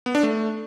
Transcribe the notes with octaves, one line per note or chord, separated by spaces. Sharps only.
B3
D4
A3